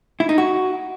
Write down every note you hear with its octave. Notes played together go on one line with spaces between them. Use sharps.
E4
D#4
F#4